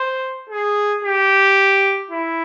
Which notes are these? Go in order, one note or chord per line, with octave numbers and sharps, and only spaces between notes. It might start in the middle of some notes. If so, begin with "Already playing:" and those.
Already playing: C5
G#4
G4
E4